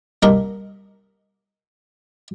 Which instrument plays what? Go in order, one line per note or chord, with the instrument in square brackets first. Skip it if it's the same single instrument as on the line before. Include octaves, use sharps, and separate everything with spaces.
[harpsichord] C2 A#2 D4 A#4 D#5